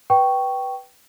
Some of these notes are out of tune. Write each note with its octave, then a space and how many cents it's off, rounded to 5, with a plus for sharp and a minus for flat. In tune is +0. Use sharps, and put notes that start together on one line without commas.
B4 -5 G5 -15 C#6 +0